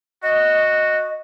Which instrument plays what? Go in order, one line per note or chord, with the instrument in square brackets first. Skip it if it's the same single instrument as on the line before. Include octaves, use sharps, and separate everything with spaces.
[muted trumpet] F#4 [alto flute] D#5